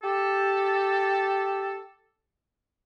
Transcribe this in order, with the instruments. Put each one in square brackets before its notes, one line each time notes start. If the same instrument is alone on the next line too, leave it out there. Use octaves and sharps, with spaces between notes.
[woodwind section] G4 A4